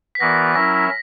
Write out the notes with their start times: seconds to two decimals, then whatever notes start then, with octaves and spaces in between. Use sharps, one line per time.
0.15 B6
0.20 E3 B3 F#4 A#4 D5 A#6
0.55 F#3 C#4 E4 A#4 E5 A#6